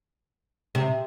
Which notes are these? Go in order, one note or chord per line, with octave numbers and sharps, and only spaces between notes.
C3